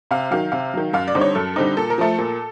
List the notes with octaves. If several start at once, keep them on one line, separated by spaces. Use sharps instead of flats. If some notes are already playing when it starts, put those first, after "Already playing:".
C3 F5
D#3 F#3 F5
C3 F5
D#3 F#3
F#2 F5
D5
D3 G3 C4 D#4
C#5
F#2 A4
D3 G3 C4 D#4
A#2 A4
A#4
F3 A3 A4
A#2